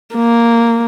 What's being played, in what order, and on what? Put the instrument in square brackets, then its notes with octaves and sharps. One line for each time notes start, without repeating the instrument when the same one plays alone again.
[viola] A#3